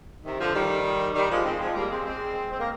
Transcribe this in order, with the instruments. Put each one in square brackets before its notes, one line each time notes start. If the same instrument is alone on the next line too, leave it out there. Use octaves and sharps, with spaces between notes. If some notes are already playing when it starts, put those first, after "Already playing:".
[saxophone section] C3 D#3
D3 F3
D#3 G3
D#3 G3
F3 G#3
G#3 C4
F3 G#3
G3 A#3
G#3 C4
G#3 C4
C4
A#3